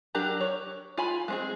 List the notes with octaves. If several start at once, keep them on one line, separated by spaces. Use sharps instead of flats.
F#3 D4 G4 A#4 A#5
C#5
F4 G#5 B5
G#3 C4 G#4